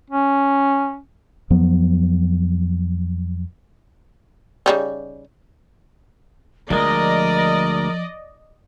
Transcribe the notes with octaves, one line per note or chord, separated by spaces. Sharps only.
C#4
F2 F3 F#3 B3
C#3 G3 D#4
D2 F3 G#3 A#4 D5 D#5